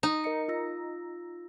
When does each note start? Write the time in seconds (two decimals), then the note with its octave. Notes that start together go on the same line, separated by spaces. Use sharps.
0.03 D#4
0.24 A#4 D#5 C#7
0.48 F4 E6 A#6